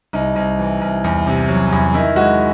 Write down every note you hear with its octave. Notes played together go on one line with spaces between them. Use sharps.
C2 D#4
C2
E3
C2
E2
C3
F#3
E2
D#3 E4
G#3 F#4